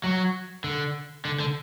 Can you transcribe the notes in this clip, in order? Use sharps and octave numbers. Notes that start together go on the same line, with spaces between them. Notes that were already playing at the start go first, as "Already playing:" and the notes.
F#3
D3
D3
D3